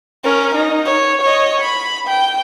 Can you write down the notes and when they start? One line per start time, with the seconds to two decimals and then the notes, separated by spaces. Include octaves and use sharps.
0.24 C#4 A#4
0.55 D#4
0.86 C#5
1.21 C#5 D#5
1.60 B5
2.08 G5